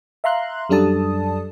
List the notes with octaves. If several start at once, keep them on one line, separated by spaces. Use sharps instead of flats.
E5 F5 A#5 C6 F#6
F#2 G3 D4 A4 A5 D#6